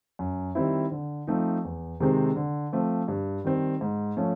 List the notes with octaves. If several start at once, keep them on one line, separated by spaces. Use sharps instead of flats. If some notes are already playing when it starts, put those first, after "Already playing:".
F#2
D#3 G3 C4 E4
D3
F3 A3 C4 D#4
E2
C3 D#3 G#3 C4
D3
F3 A3 C4
G2
D#3 G3 C4
G#2
F3 A3 C#4